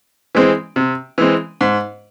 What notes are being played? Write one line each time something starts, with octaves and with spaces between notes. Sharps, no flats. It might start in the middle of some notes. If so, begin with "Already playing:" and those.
E3 G#3 C4
C3
E3 G#3 C4
G#2